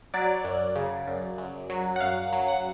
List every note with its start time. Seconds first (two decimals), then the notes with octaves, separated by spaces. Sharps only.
0.14 F#3 D5
0.44 F#2
0.76 C#3
1.07 F#2
1.38 F#2
1.70 F#3
1.96 F#5
2.00 F#2 F5
2.32 F#3
2.48 F#5